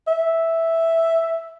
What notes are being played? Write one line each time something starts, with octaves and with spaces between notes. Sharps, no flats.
E5